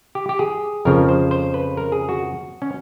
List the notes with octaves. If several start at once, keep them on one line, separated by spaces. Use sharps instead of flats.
G4
G4
G#4
F2 C#3 F3 A#4
C5
C5
B4
A#4
G#4
F#4
C#4